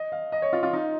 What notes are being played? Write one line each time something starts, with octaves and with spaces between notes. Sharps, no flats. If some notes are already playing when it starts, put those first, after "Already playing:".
Already playing: D#5
F5
D#5
C#5
F4
F4
D#4